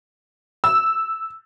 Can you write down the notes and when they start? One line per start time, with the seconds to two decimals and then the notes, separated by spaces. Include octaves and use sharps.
0.64 E6